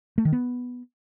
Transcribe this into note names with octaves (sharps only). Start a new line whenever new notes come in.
A3
D#3
B3